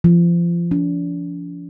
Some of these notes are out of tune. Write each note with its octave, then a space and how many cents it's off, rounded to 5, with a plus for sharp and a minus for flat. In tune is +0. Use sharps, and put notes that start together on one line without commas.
F3 -30
D4 -40